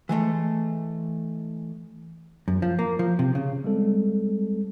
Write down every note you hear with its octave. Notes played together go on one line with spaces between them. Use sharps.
E3 G#3 A3
F#2
F3
A#3
F3
C3
C#3
G3 G#3 C4 A4